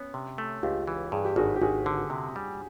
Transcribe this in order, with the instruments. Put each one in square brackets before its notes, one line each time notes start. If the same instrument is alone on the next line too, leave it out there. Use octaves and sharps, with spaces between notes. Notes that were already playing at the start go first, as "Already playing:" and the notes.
Already playing: [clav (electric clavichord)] B3 [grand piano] C#4
[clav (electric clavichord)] C3
A3
[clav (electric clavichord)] C#2 [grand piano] F4 G4
[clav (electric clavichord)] E3
[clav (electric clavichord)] G2 [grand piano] G#4
[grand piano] G4
[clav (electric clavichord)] G#1 [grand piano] F#4 G#4
[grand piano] G4
[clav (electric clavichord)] G#1 [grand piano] F#4 G#4
[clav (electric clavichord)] D3
C3
G3